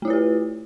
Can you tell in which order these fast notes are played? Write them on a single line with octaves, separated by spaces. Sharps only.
A3 E4 F4 B4 G4